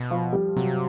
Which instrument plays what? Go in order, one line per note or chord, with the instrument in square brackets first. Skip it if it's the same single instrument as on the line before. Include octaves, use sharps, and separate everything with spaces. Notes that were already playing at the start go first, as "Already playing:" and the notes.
Already playing: [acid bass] B2
[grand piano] F3 F4
G3 G4
[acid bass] C3 [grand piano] F#3 F#4